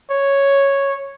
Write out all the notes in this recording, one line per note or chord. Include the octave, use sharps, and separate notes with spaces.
C#5